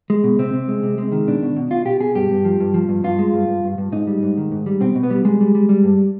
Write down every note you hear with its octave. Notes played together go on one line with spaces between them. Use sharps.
G#3
B2
C3 C4
C3
G#3
C3
G#3
D#3
B2 D4
B2
B2
B2 F4
B2 G4
B2 G#4
G2 G4
G2
F3
G2
F3
G2
G2 F4
G#3
G2
G2
G2
G2
G#2 D#4
G3
G#2
D#3
G#2
G3
B2 C4
B2
B3
G3
G3 G#3
G3
G3
G3
G2